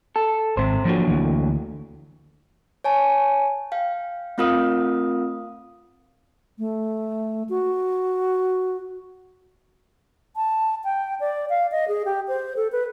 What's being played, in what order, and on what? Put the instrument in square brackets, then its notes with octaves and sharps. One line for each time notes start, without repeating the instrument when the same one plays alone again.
[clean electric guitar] A4
[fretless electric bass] G#1 [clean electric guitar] C3 C5
[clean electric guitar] A#2 D3 F#3 [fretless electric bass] F3
[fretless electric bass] D2 E3
[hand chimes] C#5 G#5 A5
F5 G5
A3 C4 F4 A#4 F5 D#6
[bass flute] A3
F#4
[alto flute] A5
G5
D5
F5
D#5
G#4
G4
C5
A4
B4